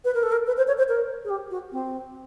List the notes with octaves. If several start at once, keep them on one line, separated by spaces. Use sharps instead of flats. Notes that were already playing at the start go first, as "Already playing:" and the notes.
B4
A#4
A4
A#4
B4
C5
C#5
C5
A#4
G#4
G4
F#4
C4